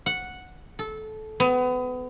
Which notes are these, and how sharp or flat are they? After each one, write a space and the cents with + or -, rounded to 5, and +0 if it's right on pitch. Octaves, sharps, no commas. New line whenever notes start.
F#5 -5
A4 -20
B3 +30